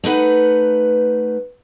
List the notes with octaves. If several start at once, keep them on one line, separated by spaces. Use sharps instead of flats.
A3 D#4 B4 F#5